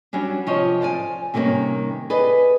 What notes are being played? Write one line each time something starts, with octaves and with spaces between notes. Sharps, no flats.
F#3 G3 C#4 D4
C3 F3 C#5 D#5
C5 D5 F5 G#5
C3 D#3 G3 A#3 C#4
G#4 B4 D5 D#5